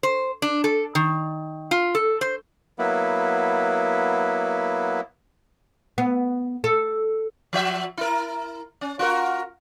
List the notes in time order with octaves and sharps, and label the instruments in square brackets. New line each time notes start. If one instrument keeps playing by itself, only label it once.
[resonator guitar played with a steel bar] C5
D4
A4
D#3
F4
A4
C5
[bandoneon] F#3 A#3 B3 E4
[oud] B3
A4
[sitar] F3 F#4 E5
E4 A#4
C#4
F4 F#4 A#4